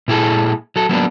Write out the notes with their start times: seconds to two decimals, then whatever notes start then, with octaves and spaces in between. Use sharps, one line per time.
0.08 A#2 E4 G#4 A4
0.76 F#3 A4
0.89 F#3 A#3 B3 D4